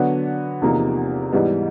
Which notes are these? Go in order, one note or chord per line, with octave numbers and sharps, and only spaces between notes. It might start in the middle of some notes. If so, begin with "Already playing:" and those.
Already playing: D3 F#3 B3 D4 F#4
E2 C3 F3 A#3 D#4
G#2 E3 G3 B3